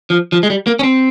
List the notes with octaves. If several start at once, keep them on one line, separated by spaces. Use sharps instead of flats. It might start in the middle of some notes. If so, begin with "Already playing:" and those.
F3
F3
G#3
G3
A#3
C#4
C4